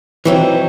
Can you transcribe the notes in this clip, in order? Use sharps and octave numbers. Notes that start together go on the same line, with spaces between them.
E3 F#3 C4 D#4